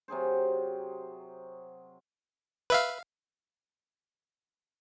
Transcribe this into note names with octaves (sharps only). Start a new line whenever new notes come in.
C3 F#3 G#4 C5
B4 E5 F5